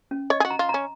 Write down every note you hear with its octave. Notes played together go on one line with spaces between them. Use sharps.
C#4
C#5 D#5
G#4
F#4
A#5
F4
C#4 A#5